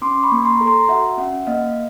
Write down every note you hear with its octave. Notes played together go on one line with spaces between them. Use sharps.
C#4 C6 D6
B5 C#6
A#3
A#5 C6
A4
A#5 C6
F#4 E5 F#5
C#4 E5 F#5
A#3 D#5 F5